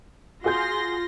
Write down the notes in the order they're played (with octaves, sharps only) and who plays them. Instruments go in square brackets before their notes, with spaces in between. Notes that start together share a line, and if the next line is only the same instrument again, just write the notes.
[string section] F4 C6 A#6 [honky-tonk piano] F#4 G#4 G6